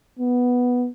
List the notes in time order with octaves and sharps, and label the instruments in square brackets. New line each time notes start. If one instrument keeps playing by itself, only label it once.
[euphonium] B3